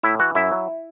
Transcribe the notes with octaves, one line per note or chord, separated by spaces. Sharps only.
A2 E4 E5
E3 F#4 F#5
F#2 E4 E5
F#3